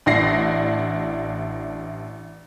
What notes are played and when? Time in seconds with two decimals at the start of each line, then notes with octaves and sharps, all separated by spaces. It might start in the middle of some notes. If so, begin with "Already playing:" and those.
0.06 A1 D4 E4 A#6 C7